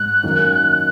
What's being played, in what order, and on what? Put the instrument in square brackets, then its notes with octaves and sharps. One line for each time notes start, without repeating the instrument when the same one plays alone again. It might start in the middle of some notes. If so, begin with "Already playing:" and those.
Already playing: [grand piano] G#2 [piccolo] F#6
[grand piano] F#2 D#3 A#3